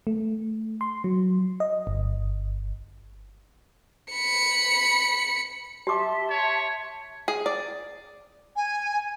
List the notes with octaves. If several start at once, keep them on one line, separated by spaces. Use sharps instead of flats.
A3
C6
F#3
D#5
G1
B5 C#7
G4 E5 A5 C6 D6
C#5
G#4
D5
G#5